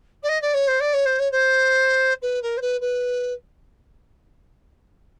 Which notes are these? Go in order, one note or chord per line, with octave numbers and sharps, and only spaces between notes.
D5
D#5
D5
C#5
C5
D5
C#5
C5
C#5
C5
B4
A#4
C5
B4
B4